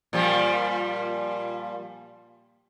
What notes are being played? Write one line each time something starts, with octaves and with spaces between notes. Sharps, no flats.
A#2 F3 G3